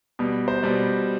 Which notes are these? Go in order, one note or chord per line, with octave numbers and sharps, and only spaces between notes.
B2 G3
C5
B2 G3 D5